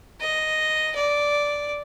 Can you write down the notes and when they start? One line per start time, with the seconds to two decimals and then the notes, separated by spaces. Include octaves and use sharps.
0.21 D#5
0.95 D5